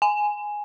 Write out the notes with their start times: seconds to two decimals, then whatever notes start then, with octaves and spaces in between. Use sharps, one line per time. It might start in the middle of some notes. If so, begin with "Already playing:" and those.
0.02 G#5